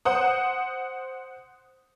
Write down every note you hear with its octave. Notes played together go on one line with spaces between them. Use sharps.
C5 F#5 D#6